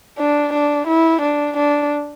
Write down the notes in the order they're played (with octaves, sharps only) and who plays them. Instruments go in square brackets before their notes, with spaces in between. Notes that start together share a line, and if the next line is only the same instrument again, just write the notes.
[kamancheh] D4
D4
E4
D4
D4